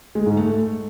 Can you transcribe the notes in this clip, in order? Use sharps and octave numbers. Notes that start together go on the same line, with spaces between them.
G#3
G#2
A3